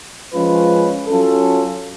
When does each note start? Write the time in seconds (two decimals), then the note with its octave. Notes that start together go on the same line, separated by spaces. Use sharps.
0.34 F3 G#3 C#4 F4 B4
1.07 F#3 C#4 F4 A4